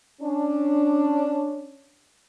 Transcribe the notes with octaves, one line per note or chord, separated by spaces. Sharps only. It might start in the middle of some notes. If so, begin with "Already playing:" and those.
C#4 D4